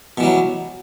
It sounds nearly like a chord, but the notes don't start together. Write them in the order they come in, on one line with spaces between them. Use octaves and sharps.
B2 E3 G3 F#3